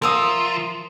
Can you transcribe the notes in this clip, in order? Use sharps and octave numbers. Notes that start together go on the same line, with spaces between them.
F3 A#4 E5 D#6